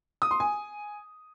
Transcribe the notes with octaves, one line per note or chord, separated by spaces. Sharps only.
D#6
C6
G#5